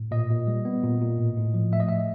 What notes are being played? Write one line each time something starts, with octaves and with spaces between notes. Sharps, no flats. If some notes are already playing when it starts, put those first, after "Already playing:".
Already playing: A2
A#2 D#5
A#2
G3
B3
A#2
A#2
A2
A2
F3
A3 E5
D#5
A2 E5